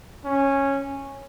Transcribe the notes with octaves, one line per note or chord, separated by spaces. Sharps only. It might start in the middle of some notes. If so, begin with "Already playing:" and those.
C#4